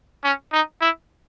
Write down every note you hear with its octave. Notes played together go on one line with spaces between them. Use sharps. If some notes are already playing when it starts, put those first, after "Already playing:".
C#4
D#4
E4